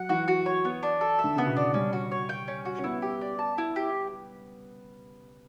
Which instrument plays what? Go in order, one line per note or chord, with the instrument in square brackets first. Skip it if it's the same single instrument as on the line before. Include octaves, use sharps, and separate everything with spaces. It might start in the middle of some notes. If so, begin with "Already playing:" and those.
Already playing: [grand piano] F#3 [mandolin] F#5
[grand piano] E3 [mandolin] F#4
[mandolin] F#4
C#5
B3
D4
A4
E5
[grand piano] D3
[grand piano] C#3 [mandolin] B3
[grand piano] B2
[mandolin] D4
[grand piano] G3 [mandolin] C#4
[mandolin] F#4
C#5
G5
C#4
F#4
[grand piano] C#4
[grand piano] B3 [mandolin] E4
[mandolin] G4
D5
A5
E4
G4